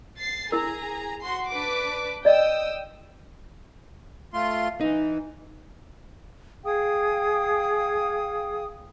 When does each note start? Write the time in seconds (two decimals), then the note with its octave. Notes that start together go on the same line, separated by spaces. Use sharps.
0.17 A6 C7
0.52 E4 G#4 A#4 A#5
1.21 F#4 C6 C7
1.49 D4 B4 D6
2.25 D5 D#5 G5 D#6 E6
4.33 A3 F4 C6
4.81 E3 D#4
6.65 G#4 F5 G5 D#6